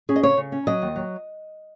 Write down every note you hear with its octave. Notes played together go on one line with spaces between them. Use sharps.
C#4 G#4
D#5
C#3 C#5
C#3
C#4
F#3 D#5
D#2
F#3